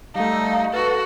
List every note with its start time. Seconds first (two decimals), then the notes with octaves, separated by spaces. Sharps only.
0.15 G3 A3 D#4 F5
0.73 F#4 A4 B4